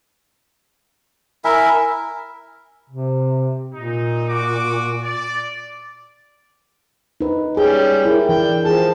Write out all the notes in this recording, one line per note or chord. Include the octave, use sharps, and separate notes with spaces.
E4 A#4 E5 G#5
C3
A#2 D#4
F#4 D6
D5
D#4 B4
G3 C#4 G#4 G5
E4 G#4 A#4
E3 D4 G5
F3 G#4 A5